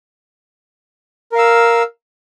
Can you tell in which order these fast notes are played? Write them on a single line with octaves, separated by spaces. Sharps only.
A#4 F5 E6